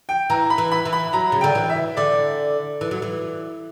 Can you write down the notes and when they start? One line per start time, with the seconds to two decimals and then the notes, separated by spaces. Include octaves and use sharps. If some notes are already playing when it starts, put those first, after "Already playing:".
0.09 G5
0.30 E3 A#5
0.50 B5
0.58 E3
0.71 B5
0.85 E3
0.93 B5
1.13 F#3 A#5
1.32 C#3
1.41 D3 G5
1.55 E3
1.70 E5
1.97 D3 D5
2.81 E3
2.91 F#3
3.02 E3